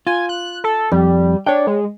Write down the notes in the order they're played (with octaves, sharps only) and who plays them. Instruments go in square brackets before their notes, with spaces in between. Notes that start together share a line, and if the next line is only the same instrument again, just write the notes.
[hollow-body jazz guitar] F4 [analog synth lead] G#5
[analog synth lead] F#6
A4
[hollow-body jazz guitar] F2 [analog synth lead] G3
[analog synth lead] D4 [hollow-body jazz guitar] C#5 G5
[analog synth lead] G#3